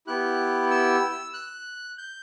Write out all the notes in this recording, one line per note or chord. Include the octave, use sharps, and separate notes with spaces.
B3 E4 G4 F#6
E6
F#6
G6